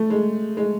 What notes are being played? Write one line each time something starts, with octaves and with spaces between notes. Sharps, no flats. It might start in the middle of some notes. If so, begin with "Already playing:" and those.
Already playing: A3
G#3
G#3